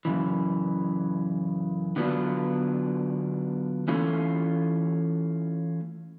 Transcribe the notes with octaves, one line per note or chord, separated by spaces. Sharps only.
F#2 C#3 E3
D3 F#3 B3 D4 F4
E3 A3 C#4 F4